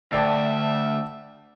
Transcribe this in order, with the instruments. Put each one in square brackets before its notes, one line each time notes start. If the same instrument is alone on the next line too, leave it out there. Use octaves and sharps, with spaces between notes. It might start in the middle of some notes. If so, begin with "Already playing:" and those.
[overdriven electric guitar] D2 [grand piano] D5 G5 A5 [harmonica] E5